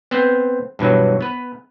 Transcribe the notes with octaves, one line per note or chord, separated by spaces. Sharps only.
B3 C4 C5
G2 B2 E3 F#3
B3 B4